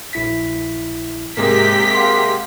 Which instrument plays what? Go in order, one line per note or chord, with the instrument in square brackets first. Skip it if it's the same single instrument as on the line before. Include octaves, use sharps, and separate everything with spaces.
[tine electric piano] A#1 E4 B6
[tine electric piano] G#2 [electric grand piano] C3 G#3 A#3 [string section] G4 B6
[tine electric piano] F5 F#5 C6